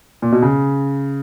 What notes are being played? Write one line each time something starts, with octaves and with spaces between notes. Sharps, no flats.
A#2
B2
C#3